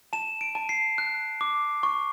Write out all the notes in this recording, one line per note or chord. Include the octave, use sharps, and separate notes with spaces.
A5 E7
D7
A5
C7
F#6
D6
C#6